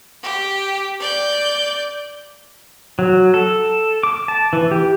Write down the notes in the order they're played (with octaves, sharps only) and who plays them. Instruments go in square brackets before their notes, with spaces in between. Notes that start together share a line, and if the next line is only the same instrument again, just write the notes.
[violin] G4
D5 G6
[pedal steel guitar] F#3
A4
D6
A5
E3
G4